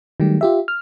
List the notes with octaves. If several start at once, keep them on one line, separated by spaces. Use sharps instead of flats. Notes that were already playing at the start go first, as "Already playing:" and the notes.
D#3 F#3 G3 A3 G4
F4 G4 E5
F6